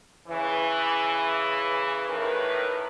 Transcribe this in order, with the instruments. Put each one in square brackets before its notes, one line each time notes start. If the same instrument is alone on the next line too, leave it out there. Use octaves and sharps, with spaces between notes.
[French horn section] C#3 E3
F#2 A2 D#3 A#4 B4